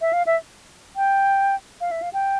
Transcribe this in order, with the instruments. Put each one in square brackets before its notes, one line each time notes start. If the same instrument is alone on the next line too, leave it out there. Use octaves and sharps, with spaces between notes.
[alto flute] E5
F5
E5
G5
F5
E5
F5
G5